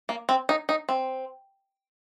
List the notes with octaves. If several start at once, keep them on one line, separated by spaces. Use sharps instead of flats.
A#3
C4
D#4
D#4
C4